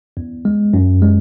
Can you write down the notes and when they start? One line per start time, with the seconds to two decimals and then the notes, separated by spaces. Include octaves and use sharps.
0.17 E2
0.45 G#3
0.74 F#2
1.02 G#3